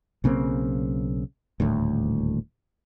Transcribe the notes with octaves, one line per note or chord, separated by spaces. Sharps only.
B1 C#3 A#3 C4
D#1 D2 A2